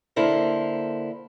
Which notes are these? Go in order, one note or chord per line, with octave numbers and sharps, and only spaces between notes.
D3 A#3 E4 A4 A#4 C5